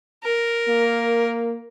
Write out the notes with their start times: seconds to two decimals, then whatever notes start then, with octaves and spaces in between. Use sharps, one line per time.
0.24 A#4
0.68 A#3